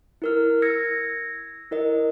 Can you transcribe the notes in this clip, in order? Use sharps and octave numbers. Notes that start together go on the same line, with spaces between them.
E4 A#4 F6
E6 G#6 A#6 C#7
E4 A#4 D#5